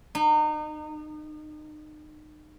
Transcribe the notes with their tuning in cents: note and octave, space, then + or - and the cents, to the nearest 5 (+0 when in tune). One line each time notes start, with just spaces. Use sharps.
D#4 -35